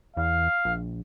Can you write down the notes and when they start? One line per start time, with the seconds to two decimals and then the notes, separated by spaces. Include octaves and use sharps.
0.17 E2 F5
0.65 A#1